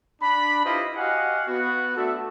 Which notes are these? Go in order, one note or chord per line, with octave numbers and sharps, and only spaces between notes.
D4 B5
E4 F4 G4 B4 C5 D#5
F#4 G4 D#5 F5 F#5 G#5
B3 F#4
A3 B3 D4 F#4 A4 E5